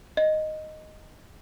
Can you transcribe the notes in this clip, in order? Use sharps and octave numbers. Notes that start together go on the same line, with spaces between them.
D#5